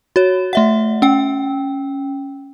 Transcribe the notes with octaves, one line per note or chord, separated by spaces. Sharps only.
F#4 C#5
A3 E5 F#5
C#4 G5